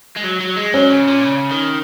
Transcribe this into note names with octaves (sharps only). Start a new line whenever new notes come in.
G#3
F#3
F#3
G#3
F#3 C#4
C#3
A#2
C#3
D#3